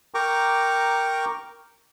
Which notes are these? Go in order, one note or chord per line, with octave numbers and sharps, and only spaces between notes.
A#4 G5 A#5 C#6 D6